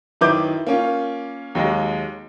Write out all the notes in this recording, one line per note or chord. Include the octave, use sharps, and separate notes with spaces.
F#2 D#3 E4 B4 D6 G6
A#3 C#4 F4
D#2 F#3 G#3